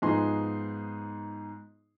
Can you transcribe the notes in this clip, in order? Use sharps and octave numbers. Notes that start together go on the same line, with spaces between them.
G#2 F3 B3 D#4 G#4 C6